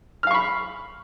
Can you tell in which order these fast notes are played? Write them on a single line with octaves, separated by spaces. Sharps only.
F6 F5 C#6 B5